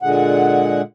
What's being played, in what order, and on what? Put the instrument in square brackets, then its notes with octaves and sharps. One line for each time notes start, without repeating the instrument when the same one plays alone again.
[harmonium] A#2 D3 G#3 F#5